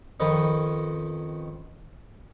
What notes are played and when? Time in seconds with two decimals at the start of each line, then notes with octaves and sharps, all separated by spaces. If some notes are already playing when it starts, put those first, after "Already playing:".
0.20 F2 D#3 C#4 B4 D#5